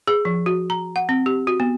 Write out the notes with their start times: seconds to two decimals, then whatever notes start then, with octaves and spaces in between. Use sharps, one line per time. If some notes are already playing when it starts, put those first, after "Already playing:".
0.08 G#4
0.25 F3
0.46 F#4
0.70 A#5
0.96 F#5
1.09 C4
1.26 G4
1.47 F#4
1.60 B3